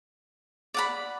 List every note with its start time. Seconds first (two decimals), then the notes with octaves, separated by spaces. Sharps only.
0.74 D5 F#5 B5